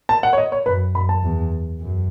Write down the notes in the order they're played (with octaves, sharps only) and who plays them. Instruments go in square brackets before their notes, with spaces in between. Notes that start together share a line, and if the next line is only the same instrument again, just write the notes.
[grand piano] A5
F#5
C#5
D#5
C#5
[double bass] F#2 [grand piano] B4
[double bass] F#2 [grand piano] B5
[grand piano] A5
[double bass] E2
F#2